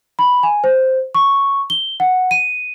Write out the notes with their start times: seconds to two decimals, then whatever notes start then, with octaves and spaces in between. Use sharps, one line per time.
0.19 B5
0.43 G#5
0.64 C5
1.15 C#6
1.70 G7
2.00 F#5
2.31 D#7